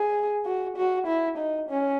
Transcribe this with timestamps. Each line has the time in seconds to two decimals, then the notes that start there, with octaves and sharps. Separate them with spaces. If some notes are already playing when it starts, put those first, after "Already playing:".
Already playing: G#4
0.46 F#4
0.77 F#4
1.07 E4
1.38 D#4
1.69 C#4